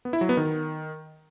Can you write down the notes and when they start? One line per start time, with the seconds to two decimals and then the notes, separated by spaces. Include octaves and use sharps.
0.05 B3
0.13 E4
0.21 F#3
0.29 B3
0.37 D#3